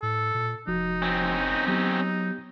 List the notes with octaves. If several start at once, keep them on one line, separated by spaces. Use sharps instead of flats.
A2 A4
A#2
F1 F3 D#4 F#4
C4 C#4
F#3 B3 D#4 G4